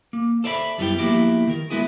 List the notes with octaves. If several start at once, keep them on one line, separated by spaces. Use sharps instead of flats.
A#3
A4 C5 D5 E5 F5 B5
F#2 G3 G#3 B3 E4 G5
F3 A#3 B3 E4 F#4 G4
D#3 A#4
G#3 B3 E4 F#4 G#4